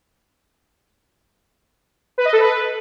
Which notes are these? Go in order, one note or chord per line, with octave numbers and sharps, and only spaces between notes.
B4
D#5
A4
B4